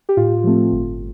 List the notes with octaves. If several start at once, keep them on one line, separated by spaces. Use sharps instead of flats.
G4
A2 F4
F3 A3 C4
G1